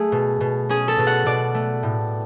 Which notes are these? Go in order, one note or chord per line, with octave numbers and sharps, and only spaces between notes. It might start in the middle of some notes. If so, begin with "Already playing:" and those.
Already playing: A3 G#4
B2
B2
C#4 G#4
A4
B2
F#5
B2 D5
A3
A2